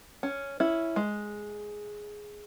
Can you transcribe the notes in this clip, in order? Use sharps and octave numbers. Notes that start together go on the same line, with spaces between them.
C#4
C#4 E4
G#3